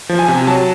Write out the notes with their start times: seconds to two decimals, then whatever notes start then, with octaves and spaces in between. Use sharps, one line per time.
0.09 F3
0.19 G#5
0.28 C3
0.47 F#3 A5